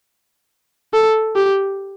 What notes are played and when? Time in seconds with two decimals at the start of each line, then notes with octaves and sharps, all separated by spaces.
0.94 A4
1.36 G4